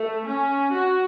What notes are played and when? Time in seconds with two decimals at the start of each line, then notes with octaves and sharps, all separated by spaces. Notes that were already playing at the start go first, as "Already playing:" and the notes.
Already playing: A3
0.26 C#4
0.71 F#4